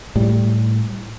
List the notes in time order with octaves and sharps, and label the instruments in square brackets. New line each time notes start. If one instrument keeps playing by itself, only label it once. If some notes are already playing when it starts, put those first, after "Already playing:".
[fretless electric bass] A2 G3